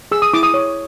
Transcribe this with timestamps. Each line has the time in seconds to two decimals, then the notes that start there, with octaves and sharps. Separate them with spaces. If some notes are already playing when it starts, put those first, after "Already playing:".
0.12 G#4 E6
0.22 D#6
0.33 E4 D6
0.43 D#6
0.54 C#5